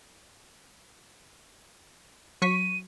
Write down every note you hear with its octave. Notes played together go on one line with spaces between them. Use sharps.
F#3 C#6 B6 D#7